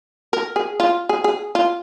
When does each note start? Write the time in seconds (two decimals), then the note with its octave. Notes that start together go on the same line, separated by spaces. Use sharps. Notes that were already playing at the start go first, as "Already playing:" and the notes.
0.33 A#4
0.56 G#4
0.80 F4
1.09 G#4
1.24 G#4
1.55 F4